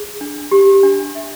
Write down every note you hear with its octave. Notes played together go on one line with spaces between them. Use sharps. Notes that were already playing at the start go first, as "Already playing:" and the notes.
Already playing: G#4
D4
G4
D4
E5